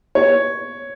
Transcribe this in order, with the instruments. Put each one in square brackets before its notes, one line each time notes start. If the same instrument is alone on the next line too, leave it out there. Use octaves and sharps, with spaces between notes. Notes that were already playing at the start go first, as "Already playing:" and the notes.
[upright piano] C#5